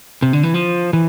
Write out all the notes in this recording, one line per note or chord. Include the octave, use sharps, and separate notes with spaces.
C3
D3
E3
F3
E3